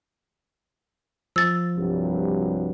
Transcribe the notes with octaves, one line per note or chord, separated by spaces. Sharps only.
F3 E6 A6
C2 G2 F#3